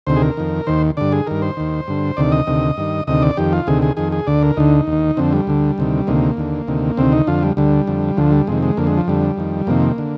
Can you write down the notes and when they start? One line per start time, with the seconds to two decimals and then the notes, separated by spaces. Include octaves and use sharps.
0.07 D2 C3 D#3 C5
0.16 G#4
0.22 A#4
0.37 F2 D#3
0.67 D#2 D#3 C5
0.97 G2 D3 D5
1.12 G#4
1.27 G2 D#3 A#4
1.42 C5
1.57 D#2 D#3
1.88 G2 D3
2.17 D2 C3 D#3 D5
2.32 D#5
2.47 D2 C3 D#3
2.77 G2 D#3
3.07 D2 C3 D#3 D#5
3.22 D5
3.37 F2 D#3 G4
3.53 F4
3.67 D2 C3 D#3 G#4
3.82 G#4
3.97 F2 D#3 G#4
4.12 G#4
4.27 D2 D3 D5
4.43 A#4
4.57 D2 D3 D#4
4.87 D#2
4.92 D#3
5.17 F2 D3 C4
5.33 G3
5.47 D2 D3
5.78 D2 C3 D#3
6.07 D2 C3 D#3 A#3
6.37 D#2 D3
6.68 D2 C3 D#3
6.97 D2 C3 D#3 C4
7.13 D#4
7.27 F2 D3 F4
7.43 G3
7.57 D2 D3 G3
7.87 F2 D3
8.17 D2 D3 F3
8.32 G3
8.47 F2 C3 D#3 G#3
8.63 G#3
8.77 F2 D3 A#3
8.87 G#3
8.97 F3
9.08 F2 D3 G3
9.38 F2 D#3
9.67 F2 C3 D#3 A#3
9.98 D3